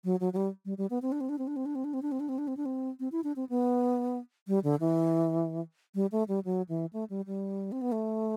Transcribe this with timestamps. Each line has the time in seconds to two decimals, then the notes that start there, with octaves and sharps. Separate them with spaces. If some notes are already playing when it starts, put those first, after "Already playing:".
0.04 F#3
0.20 F#3
0.33 F#3
0.36 G3
0.65 G3
0.78 G3
0.90 B3
1.02 C4
1.12 D4
1.21 C4
1.29 D4
1.39 C4
1.47 D4
1.56 C4
1.66 D4
1.75 C4
1.84 D4
1.94 C4
2.02 D4
2.12 C4
2.20 D4
2.29 C4
2.38 D4
2.48 C4
2.57 D4
2.66 C4
3.00 C4
3.12 E4
3.24 D4
3.36 C4
3.49 B3
4.48 G3
4.64 D3
4.80 E3
5.95 G3
6.12 A3
6.28 G3
6.45 F#3
6.69 E3
6.93 A3
7.10 G3
7.27 G3
7.72 C4
7.81 B3
7.92 A3